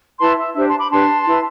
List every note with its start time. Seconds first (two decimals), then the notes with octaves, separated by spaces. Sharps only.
0.20 E4 B4 A5 C6
0.38 E5
0.55 D4 G4 C5 E5
0.67 A5 C6
0.79 B5 D6
0.91 D4 G4 B4 A5 C6
1.27 E4 B4